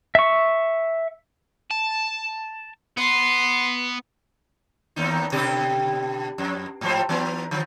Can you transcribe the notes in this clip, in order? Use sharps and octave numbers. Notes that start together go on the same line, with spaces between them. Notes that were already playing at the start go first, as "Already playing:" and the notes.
E5 C#6
A5
B3 C6
D#2 A#3 D#4
B2 D3 G4
F2
G#2 F3 C5
E3 B3 D#4
D3 F3